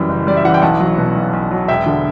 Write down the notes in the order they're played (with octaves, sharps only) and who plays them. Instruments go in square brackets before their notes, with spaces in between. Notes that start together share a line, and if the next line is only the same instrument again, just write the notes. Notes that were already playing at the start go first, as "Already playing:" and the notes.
Already playing: [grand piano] F#2 E3 G3
F#1
G3 D5
E5
E3 F#5
G5
B1 F#5 A5
F#3
B2
B1
B1
F#3
E1 E5 G5
D3